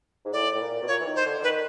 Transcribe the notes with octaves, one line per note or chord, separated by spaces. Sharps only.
G#2
A2 D5
A2
A#2
B2
A#2 C#5
E3
D#3
C5
D3
D3
D#3 B4